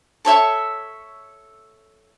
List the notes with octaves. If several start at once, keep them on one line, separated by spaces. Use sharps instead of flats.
A4 C#5 E5 C#6